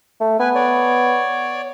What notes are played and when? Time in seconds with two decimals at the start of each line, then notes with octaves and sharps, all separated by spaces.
0.21 A3
0.40 B3 B4 G#5
0.55 C#5 D5